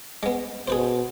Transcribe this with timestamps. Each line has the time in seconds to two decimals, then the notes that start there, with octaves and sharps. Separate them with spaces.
0.23 G#3 B3
0.68 B2 G#4 B4 C5